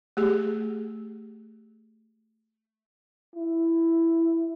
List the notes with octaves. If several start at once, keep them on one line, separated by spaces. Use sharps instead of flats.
A3 G4 G#4
E4